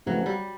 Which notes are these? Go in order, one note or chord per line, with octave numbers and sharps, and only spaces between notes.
F2 C#3 E3 F#3 A3
G3